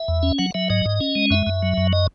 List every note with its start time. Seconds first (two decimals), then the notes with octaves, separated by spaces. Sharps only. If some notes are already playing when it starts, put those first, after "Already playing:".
Already playing: E5
0.08 E2
0.23 C#4
0.38 F#3 F#5
0.54 F#3 E5
0.70 G#2 D#5
0.86 G#2
1.01 C#4
1.15 G#3
1.31 F#2 E5
1.46 F#2
1.62 F#3
1.77 F#2
1.93 D#5